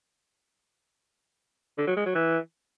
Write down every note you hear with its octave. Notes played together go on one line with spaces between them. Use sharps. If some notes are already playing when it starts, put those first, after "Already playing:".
D3
F#3
G#3
F#3
E3